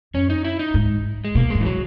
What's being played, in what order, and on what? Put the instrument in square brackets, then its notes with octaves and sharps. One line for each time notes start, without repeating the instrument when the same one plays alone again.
[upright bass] F#2 [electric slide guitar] C#4
[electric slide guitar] D#4
E4
D#4
[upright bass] G#2
[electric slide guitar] G#3
[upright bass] B2 [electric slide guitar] A#3
[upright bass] G#2 [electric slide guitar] G#3
[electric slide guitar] E3
F#3